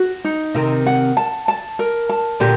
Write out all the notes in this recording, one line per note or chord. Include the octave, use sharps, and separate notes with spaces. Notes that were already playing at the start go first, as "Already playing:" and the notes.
Already playing: F#4
D#4
C3 D#3 A#4
F#5
A5
A5
A#4
A5
A#2 D3 G4